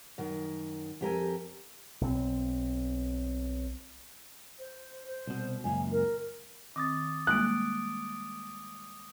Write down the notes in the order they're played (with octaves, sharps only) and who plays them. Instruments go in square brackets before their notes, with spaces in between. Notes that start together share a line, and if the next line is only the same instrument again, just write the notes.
[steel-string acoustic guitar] F#2 D#3
F2 G4 A#4 G#5
[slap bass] B1 C4
[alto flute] C5
C5
[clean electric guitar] C2 B2
[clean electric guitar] C#2 F#2 A#2 [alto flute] G#5
[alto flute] A#4
[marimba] D#3 C4 A#6 [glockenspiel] D6 D#6 A6
[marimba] G3 G#3 A#3 [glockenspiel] D#6 D7 [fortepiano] F#6